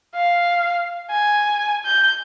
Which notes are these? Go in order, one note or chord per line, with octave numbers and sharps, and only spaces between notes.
F5
G#5
G6